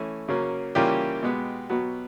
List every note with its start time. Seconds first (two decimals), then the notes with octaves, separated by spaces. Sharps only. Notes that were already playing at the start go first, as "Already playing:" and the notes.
Already playing: E3 A3 C#4
0.28 C#3 F#3 A#3 C#4
0.75 C#3 E3 G3 A#3 C#4 F4 G4
1.23 B2 G#3 B3
1.70 B2 F#3 B3